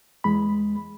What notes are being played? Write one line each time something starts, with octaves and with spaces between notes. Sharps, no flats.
E2 G#3 B5